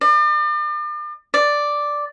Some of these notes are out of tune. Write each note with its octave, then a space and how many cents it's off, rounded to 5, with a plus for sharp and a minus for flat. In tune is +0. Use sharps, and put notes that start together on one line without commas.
D5 +40
D5 +0